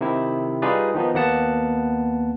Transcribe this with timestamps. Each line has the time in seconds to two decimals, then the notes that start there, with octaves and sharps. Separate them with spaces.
0.01 C3 D#3 E4
0.62 G3 D#4 F4 G#4 B4 D5
0.95 D#3 F3 B3 D#4
1.14 D#2 A#3 B3 F#5 A5